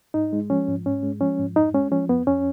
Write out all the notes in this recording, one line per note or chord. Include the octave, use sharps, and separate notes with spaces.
G#2 D#4
G#3
F3 C#4
G#2
G#2 C#4
G#3
F3 C#4
G#2
F2 D#4
G#3 C#4
F3 C#4
F2 B3
F2 C#4